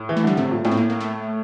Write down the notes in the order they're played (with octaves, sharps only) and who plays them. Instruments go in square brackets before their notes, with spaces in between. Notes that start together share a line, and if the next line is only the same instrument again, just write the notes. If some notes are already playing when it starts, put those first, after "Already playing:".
Already playing: [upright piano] A2
E3
[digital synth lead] A3
[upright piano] D3 [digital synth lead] G3
[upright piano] C3 [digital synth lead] A3
[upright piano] A#2
[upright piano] A2 [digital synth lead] A3
[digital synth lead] C4
A#3
A#3
A3